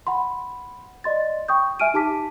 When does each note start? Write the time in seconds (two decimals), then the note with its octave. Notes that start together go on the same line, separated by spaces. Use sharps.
0.07 F#5 B5 C6
1.04 D5 D#5 C6 A6
1.48 G5 C#6 D#6 G6
1.80 E5 G#5 F6 D7 D#7
1.94 D#4 G4 A5 D6 B6